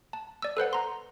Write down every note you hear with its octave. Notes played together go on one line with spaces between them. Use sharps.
A5
D5 E6
A4 B4 C5 F#5
A#5 C6